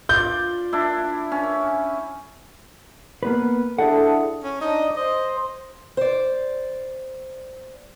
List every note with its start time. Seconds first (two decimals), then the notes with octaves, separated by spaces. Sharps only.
0.09 F4 D5 G6
0.73 D4 E4
1.32 C#4
3.23 A#3 B3 B4
3.79 D4 E4 G#4 A4 D5 F#5
4.44 C#4
4.61 D4 D#4 D#5
4.97 C5 D#5
5.97 C5 D5